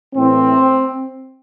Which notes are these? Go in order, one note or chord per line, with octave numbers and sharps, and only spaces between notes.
A2 E3 C4